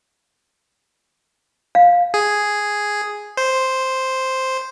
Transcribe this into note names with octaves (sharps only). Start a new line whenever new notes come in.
F5
G#4
C5